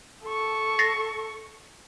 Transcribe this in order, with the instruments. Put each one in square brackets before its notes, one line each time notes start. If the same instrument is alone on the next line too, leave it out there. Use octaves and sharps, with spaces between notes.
[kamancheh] A4 C#6
[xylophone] A6 A#6 C7